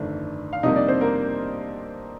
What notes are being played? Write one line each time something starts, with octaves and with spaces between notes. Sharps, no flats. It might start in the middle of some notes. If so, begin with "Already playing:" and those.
Already playing: G1 F2 D#3 A3 D4
F5
F2 C3 G3 A#3 D#4 D#5
D4 D5
C4 C5
A#3 A#4